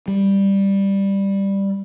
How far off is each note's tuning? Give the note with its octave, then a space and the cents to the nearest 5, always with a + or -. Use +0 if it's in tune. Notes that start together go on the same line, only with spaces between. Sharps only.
G3 +5